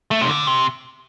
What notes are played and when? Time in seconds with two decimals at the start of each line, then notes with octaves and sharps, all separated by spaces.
0.11 A3
0.22 C3
0.29 D3
0.47 C3